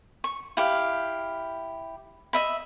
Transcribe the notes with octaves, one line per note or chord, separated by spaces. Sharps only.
C#6
E4 G4 F5
D#5 E5 B5